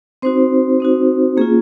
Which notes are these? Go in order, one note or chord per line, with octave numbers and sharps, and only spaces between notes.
C4 D#4 F#4 C5
C4 D#4 F#4
A#3 C#4 F4 G#4